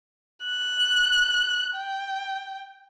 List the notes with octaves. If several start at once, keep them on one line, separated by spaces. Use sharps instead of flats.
F#6
G5